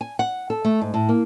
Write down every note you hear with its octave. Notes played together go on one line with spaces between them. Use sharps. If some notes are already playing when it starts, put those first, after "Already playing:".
G#5
F#5
A4
A3
G#2
A2
A#3